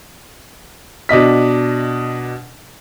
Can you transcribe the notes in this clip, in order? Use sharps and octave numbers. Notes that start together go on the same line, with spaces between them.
B2 D4 D#5 B6